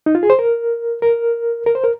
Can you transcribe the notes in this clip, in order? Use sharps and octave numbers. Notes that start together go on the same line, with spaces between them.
D#4
F4
G#4
C5
A#4
A#4
A#4
C5
A#4